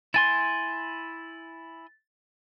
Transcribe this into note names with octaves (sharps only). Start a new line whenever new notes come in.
E4 G#5 C6 A6